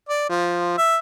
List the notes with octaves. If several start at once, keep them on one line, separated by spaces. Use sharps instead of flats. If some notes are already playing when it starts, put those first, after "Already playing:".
D5
F3
E5